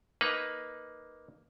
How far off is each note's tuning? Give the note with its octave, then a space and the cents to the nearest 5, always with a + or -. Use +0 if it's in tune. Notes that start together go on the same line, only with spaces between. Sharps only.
A#3 +5 D#4 +0 B4 +0